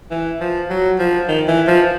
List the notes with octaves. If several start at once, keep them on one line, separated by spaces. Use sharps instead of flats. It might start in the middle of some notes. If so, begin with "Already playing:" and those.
E3
F3
F#3
F3
D#3
E3
F3